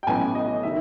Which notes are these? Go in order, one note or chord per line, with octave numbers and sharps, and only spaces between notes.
G5
A1 A2 F#3 B3 G#5
D#5
D#3 E5